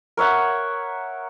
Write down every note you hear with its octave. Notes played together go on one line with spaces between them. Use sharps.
A#4 C#5 E5 F#5